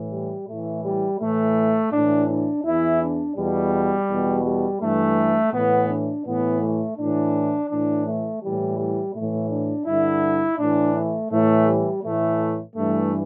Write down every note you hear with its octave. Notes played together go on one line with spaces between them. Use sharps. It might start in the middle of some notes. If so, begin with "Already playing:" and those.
Already playing: A2 E3
G3
A2 E3 A3
G3
A2 E3 A3
A2 E3 D4
D4
E2 E3 E4
D4
E2 B2 G3
E2 B2
G3
G2 E3 A3
A2 E3 B3
D4
A2 E3 B3
A3
A2 E3 D4
A2 E3 D4
A3
A2 E3 G3
G3
A2 E3 A3
D4
G2 D3 E4
A2 E3 D4
A3
A2 E3 A3
G3
A2 E3 A3
G2 E3 A3